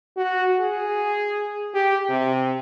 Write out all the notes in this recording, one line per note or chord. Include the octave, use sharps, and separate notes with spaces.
F#4
G#4
G4
C3